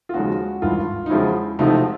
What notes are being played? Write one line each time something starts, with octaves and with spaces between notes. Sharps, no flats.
F4
D#2 C#3 F3 G#3 F#4
G#1 G2 E3 F4
D#4
E2 C#3 F3 G#3 E4
E1 E2 C3 F3 A3 D#4